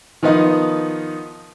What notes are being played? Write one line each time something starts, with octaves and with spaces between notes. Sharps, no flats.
D#3 F3 B3 D#4